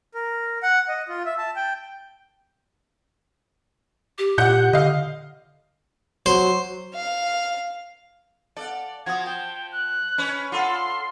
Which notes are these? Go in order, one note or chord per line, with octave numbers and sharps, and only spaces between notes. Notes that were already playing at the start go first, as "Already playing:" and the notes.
A#4
F#5
D#5
F4
E5
A5
G5
G4
A#2 F#5 G6
D3 D#5 F5
F#3 C5
F5
A4 D5 F5 F#5
F3 F#4 D#6 G#6
G5 A5
F#6
C#4 B4 C#5
F4 A4 D5 F#5 C6